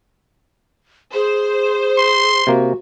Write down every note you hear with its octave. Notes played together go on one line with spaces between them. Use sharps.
G#4 C5
C6
C3 A#3 F#4